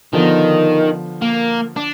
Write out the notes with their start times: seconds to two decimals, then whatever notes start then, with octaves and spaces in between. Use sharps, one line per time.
0.13 D3 D#3 F3 B3
1.22 A#3
1.76 D4